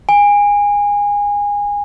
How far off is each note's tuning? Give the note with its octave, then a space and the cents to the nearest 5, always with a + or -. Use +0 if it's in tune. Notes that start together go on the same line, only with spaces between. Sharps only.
G#5 -25